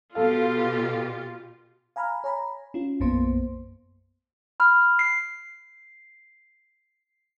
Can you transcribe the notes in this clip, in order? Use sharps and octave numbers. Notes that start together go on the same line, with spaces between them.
B2 F4 G4 A4 F5
F5 G#5 A#5 B5 F6
C#5 G#5 A#5 B5
C#4 F4
B1 F#2 A#3 B3 C5 C6
B5 F6
C7